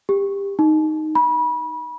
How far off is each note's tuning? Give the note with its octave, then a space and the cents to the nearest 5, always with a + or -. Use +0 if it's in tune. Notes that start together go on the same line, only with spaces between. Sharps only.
G4 +20
D#4 +0
B5 -30